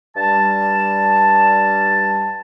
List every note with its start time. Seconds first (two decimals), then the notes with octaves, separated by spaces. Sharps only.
0.16 G2 G3 A5